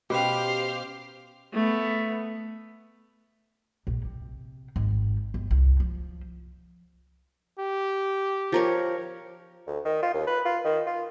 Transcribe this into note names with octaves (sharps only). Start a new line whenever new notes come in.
B2 C#4 G4 B4 C5 F5 G5
A3 B3
A#1
C3
G#1
G1
C2
F3
G4
F3 A#4 C#5
D2
D#3
F4
D#2
B4
F4
D#3
F4